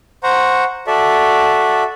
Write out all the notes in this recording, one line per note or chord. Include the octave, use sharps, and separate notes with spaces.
C5 F#5 A#5 C#6
F#4 A4 D5 E5